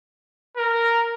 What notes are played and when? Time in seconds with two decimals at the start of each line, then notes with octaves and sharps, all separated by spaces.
0.57 A#4